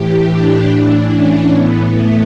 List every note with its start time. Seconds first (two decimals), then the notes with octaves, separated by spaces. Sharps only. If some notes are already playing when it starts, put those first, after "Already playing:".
Already playing: A2 E3 G4
0.28 D4
0.69 A2 E3
1.12 C#4
1.53 A2 E3 B3
1.94 A3